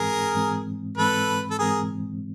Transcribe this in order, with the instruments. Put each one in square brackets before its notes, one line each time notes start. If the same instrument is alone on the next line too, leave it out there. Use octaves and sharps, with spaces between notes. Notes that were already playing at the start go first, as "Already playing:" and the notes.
Already playing: [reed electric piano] G#2 E3 G#3 C4 [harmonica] G#4 A#4
[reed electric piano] G#2 E3 G#3 C4
[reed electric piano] G#2 E3 G#3 C4 [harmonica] A4 B4
[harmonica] A4
[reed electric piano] G#2 E3 G#3 C4 [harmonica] G#4 A#4